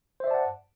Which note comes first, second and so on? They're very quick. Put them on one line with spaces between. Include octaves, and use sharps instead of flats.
C5 E5 D5 A5 F#5